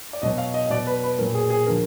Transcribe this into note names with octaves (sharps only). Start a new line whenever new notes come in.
D5
B2 F#3 D#5
F5
D#5
D#5
B2 F#3 D5
B4
B4
A#2 F#3 A#4
G#4
G#4
D3 F3 A#4